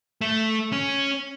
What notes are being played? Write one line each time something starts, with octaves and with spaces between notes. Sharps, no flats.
A3
C#4